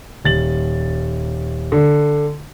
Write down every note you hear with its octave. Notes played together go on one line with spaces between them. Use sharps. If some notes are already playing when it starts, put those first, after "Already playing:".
D#1 A6 F#7
D3